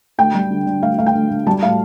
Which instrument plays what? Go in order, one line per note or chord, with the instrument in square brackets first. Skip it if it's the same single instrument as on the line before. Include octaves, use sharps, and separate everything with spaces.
[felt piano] D2 G5
G3
D3
D3
D2 F5
D2 F5
G5
D2
D2
G3 A5
A2 F5